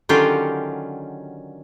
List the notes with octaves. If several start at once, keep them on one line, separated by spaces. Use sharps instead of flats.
D3 D#3 F#3 C#4 F4 G4